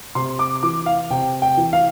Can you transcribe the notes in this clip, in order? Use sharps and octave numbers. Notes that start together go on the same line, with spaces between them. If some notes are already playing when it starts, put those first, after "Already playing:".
C3 C6
D6
E3 D6
F5
C3 G5
G5
E3
F5